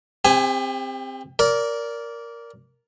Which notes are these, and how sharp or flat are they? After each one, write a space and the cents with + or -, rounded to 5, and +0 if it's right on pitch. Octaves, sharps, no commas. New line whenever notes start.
C4 +0 G4 +35 G#5 +0
A#4 +0 D5 -20